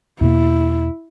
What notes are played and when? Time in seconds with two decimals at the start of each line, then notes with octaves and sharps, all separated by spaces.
0.21 E2 B2 A#3 E4